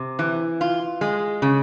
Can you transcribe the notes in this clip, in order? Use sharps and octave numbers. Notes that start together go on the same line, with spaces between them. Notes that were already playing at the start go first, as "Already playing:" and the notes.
Already playing: C3
E3
F4
G#3
C#3